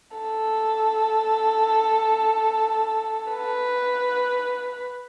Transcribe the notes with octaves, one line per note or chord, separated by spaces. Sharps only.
A4
B4